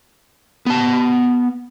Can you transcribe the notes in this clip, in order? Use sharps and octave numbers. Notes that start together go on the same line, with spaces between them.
B3 A5